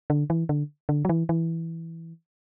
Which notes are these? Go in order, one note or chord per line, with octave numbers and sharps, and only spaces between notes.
D3
E3
D3
D3
F#3
E3
E3